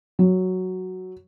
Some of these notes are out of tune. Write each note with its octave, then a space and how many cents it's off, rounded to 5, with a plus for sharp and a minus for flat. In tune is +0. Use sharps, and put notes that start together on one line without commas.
F#3 +0